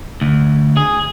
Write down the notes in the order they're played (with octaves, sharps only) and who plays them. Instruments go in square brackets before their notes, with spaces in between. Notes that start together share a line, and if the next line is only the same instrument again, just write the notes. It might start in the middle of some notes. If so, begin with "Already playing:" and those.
[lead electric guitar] D2
G#4